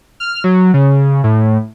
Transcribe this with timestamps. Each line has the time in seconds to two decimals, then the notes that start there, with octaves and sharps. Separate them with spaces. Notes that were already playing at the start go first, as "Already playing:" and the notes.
0.20 F6
0.44 F#3
0.74 C#3
1.24 A2